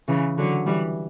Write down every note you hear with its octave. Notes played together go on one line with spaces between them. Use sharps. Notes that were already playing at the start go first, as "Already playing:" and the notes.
C#3 E3
D3 F#3
E3 G3